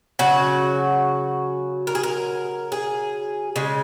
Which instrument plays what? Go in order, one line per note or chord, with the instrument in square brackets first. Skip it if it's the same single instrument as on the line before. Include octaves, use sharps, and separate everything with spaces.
[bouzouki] C#3 F#3 F#4
A#4
G#4
A#4
G#4
C#3 G#3